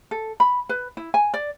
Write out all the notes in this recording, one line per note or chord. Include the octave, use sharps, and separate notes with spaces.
A4
B5
B4
E4
G#5
D5